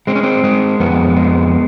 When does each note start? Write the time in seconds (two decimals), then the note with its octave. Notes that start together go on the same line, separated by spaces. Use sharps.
0.07 G#3 C4
0.15 C#4
0.23 C4
0.44 G#3
0.80 F2 B3
1.16 G#3